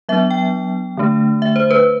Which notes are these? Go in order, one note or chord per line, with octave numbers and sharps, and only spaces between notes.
F#3 B3 D4 E5
G5
D3 A3 D4
E5
C5
B4